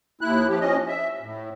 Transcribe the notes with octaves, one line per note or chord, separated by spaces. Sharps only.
D#2 E4 F#6
F3 G4
F3 C#4 D#5
E5
A2